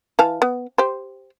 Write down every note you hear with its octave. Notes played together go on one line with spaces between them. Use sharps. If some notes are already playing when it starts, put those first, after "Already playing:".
E3 F5 A5
B3
G4 C5